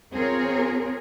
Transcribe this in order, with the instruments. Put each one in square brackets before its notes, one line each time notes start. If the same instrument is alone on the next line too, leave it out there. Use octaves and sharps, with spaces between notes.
[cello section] C4 F4 G#4 A#4 C#5